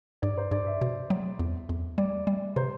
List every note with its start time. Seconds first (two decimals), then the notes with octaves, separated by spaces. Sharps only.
0.22 G2 D5
0.37 C5
0.51 G2 D5
0.66 E5
0.81 B2
1.10 F#3
1.39 E2
1.69 E2
1.98 G3 D5
2.27 G3
2.56 C3 C5